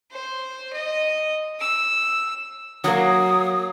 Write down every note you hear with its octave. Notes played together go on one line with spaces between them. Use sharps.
C5
D#5
E6
F#3 A#3 D#6